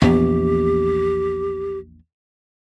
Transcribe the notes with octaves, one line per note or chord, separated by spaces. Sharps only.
A#1 E2 B3 G4